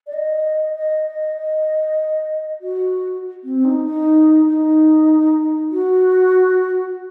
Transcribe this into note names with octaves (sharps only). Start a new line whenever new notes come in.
D5
D#5
D#5
D#5
D#5
F#4
C4
D#4
D#4
D#4
F#4